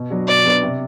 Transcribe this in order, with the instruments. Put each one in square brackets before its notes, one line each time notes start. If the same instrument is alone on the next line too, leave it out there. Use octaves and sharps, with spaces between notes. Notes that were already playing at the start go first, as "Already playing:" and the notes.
Already playing: [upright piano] B2
F#3 B3 D4 F#4
[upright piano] B2 [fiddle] D5
[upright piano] F#3 B3 D4 F#4
C3